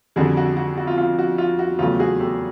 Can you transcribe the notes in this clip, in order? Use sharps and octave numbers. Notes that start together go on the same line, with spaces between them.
F2 D3 G3 F#4 G#4
F#4
F#4
F#4
F4
F4
F#4
F4
F#4
E2 C#3 F#3 A3 F4 G4
F#4 G#4
G4 A4